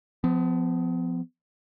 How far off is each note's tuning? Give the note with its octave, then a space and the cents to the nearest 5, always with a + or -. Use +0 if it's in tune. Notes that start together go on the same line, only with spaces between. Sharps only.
F3 +0 B3 +40